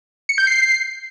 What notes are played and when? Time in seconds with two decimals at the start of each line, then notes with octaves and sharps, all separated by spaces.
0.29 C#7
0.38 G6
0.47 C7